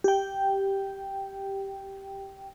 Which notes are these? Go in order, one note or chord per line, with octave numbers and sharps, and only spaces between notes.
G4 G5